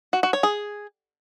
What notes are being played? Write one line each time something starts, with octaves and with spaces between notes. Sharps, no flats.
F#4
F#4
C#5
G#4